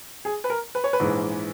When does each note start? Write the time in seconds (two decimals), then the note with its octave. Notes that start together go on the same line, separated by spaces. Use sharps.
0.25 G#4
0.44 B4
0.50 A#4
0.75 B4
0.84 C#5
0.93 B4
0.99 A#1 G#2 E3 G#3